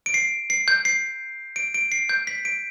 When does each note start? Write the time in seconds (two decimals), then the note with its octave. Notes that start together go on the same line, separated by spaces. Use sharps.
0.06 D7
0.14 C7
0.50 C7
0.68 G6
0.85 C7
1.56 D7
1.74 D7
1.92 C7
2.09 G6
2.27 B6
2.45 D7